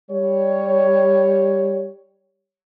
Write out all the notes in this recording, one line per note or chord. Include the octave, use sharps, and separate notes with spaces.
G3 C#5